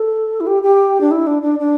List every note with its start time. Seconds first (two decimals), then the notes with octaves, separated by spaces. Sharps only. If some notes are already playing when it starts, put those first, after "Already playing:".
Already playing: A4
0.40 E4
0.47 G4
0.63 G4
1.01 D4
1.11 E4
1.27 D4
1.42 D4
1.59 D4